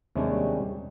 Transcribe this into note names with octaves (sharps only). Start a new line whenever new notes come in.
D#2 C3 G3 G#3 C#4 D4